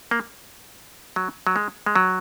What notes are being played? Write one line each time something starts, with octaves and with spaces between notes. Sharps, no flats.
A#3
F#3
F#3
G#3
G#3
F#3